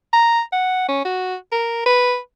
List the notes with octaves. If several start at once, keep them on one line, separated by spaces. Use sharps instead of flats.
A#5
F#5
C#4
F#4
A#4
B4